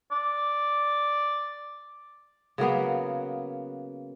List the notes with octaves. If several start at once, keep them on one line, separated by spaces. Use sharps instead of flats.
D5
C#3 F#3 A#3 B3